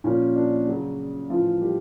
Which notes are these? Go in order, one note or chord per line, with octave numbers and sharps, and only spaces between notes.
A#2 F3 C#4
D4
C#3 F#3
A2 E3 F3 F4
G3 G4